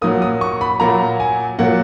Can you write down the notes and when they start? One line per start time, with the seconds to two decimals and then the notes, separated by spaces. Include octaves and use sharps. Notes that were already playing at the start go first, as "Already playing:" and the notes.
0.02 A#2 F#3 A#3 D#6
0.22 D#6
0.41 C#6
0.61 B5
0.80 A#2 F#3 A#3 A#5
1.20 G#5
1.59 A#2 F#3 A#3 F#5